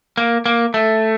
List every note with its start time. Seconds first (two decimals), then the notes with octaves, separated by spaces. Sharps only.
0.17 A#3
0.46 A#3
0.74 A3